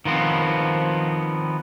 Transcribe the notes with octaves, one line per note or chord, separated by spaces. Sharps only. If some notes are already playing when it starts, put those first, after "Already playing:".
D#3 F3 B3 C4